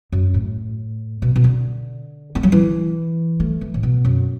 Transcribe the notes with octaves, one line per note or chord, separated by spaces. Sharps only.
F#2
A2
B2
B2
D3
A3
F#3
E3
A3
E3
A2
B2
F#2